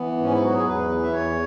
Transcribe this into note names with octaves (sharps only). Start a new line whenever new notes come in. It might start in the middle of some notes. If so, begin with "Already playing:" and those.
Already playing: E3 B3
G#2 C#4
E4
F#3 F#4
G#4
E2 B4
E3
E5
E2 C#5